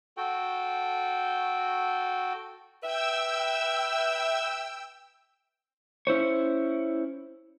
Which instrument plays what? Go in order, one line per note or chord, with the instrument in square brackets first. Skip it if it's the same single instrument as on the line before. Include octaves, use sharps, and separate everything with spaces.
[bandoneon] F#4 A4 G5
[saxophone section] B4 E5 [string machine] G5 E6
[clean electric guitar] C#4 E4 C5 C#5